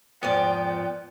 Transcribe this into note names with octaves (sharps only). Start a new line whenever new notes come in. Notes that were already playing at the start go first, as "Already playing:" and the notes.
E2 G#2 F3 B3 D5 G5